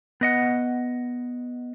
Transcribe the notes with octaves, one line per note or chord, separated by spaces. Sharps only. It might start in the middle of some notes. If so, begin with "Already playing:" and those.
B3 D#5 F#5